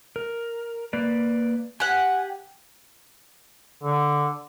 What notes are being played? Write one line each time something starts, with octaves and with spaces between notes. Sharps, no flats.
A#4
A#3 B4 D5
G4 F#5 G#5
D3